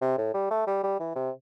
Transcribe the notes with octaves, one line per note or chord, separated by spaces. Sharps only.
C3
A2
G3
A3
G3
G3
E3
C3